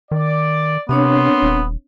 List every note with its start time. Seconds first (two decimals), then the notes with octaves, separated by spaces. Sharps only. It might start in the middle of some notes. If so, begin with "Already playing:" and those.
0.11 D#3 D5
0.89 C3 B3 C4 D4 A#4 C#5 C6
1.43 D#1